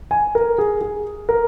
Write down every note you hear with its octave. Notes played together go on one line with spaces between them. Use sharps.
G#5
A#4
G#4
G#4
A#4